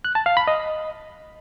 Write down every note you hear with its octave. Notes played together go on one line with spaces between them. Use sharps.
F#6
A5
F5
B5
D#5